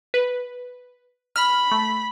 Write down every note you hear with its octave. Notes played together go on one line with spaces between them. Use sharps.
B4
B5 F6
A3